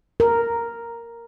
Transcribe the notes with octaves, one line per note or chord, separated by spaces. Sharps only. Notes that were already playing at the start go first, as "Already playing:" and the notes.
A#4